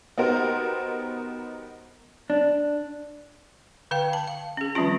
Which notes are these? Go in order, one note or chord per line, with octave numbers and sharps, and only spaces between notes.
B3 D#4 F#4 G4 A#4 C5
D4
D3 B4 F5 G5
A5
F5
C#4 G#4
D#3 F3 G3 C4 C#4 F4